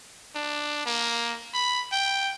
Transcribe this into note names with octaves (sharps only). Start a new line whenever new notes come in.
D4
A#3
B5
G5